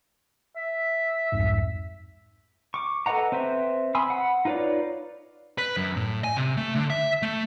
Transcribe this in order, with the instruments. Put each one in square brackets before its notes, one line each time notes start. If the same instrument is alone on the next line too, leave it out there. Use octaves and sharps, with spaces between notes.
[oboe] E5
[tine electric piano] C2 F2 G#2
[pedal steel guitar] C#6 D6
A4 B4 D#5 F#5 A#5
C4 B4 C5 E5
G#5 B5 C6 D#6 E6
F#5 B5
D#4 F4 B4 C#5 D5
[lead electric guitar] B4
F#2
A2
G#5
C3
A3
D3
E5
A3